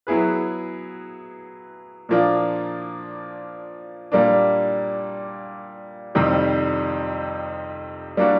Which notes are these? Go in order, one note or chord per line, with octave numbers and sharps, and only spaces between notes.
F#3 B3 E4 G#4 B4
A#2 F3 A#3 D4
A#2 G3 A#3 D4
F2 C3 D#3 G3
G3 A#3 D4 F#4